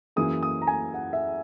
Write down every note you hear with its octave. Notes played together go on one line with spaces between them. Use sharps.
F#2 E3 A#3 E4 G#4 D#6
D#6
A#5
G#5
F#5
E5